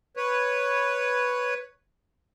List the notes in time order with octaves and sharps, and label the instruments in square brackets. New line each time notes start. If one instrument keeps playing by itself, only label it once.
[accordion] B4 C#5